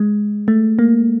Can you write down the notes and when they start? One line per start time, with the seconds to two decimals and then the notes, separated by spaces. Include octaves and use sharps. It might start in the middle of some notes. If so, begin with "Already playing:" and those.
Already playing: G#3
0.48 A3
0.79 A#3